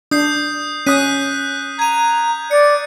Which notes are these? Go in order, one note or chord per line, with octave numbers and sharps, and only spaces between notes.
D4 D#6 G6 C7
C#4 D#6 F#6 B6 D#7
A#5 G#6 D#7
D5 C#7